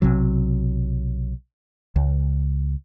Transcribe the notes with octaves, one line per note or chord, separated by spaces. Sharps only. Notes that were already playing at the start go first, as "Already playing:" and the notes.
B1 C3 F#3
C#2